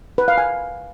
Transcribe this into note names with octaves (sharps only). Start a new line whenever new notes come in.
B4
F5
G#5